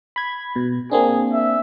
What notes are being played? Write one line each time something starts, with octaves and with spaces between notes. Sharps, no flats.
B5 G#6
B2
A#3 C4 D4 G#4
E5